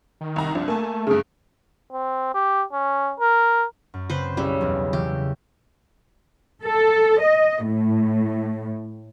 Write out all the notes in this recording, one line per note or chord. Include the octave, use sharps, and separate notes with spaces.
D#3
C2 A#5
C2 F3 D4
A3 A#3 G#5 A5
G2 C#3 A3 G#4
C4
G4
C#4
A#4
F#2
C#3 C4 B4 C5
B1 C#3 G3 E4 E6
B1 E2
C#3 E3 G4
A4
D#5
A2